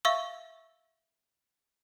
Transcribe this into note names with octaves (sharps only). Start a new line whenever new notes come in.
E5 F5 C#6 E6